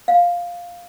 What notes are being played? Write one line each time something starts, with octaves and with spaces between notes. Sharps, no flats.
F5